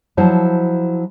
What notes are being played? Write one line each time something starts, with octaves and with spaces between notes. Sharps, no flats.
F3 F#3 E4 C5 A5